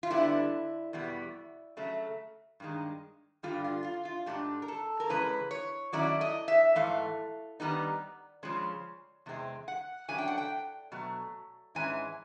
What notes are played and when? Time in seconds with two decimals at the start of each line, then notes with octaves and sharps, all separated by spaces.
0.03 F4
0.10 D3 G3 B3 E4
0.93 E2 B2 G3 B3
1.77 C#3 F#3 A3
2.60 G2 D#3 G#3
3.43 G2 D3 G3 F4
3.64 F4
3.84 F4
4.05 F4
4.26 G#2 E3 A3 D4 G4
4.62 A#4
4.68 A4
5.00 A#4
5.09 C#3 E3 G#3 B4
5.51 C#5
5.93 D#3 F#3 A3 C#4 E4 D5
6.21 D#5
6.48 E5
6.76 G#2 E3 A3 F5
7.60 D#3 G3 B3 D#4
8.43 C#3 F3 G#3 C#4
9.26 E2 C3 G#3 C4
9.68 F#5
10.08 C#3 F#3 A3 D4 G#5
10.18 G5
10.28 F#5
10.38 G5
10.92 B2 F#3 A3
11.75 G#2 E3 G#3 C#4 E4 G#5